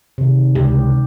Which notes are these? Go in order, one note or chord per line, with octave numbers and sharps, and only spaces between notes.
C3 D#3
C#2 G4